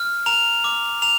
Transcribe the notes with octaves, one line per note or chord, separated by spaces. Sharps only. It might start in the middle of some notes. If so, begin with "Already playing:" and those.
Already playing: F6
A#5 F7
D6
A#5 F7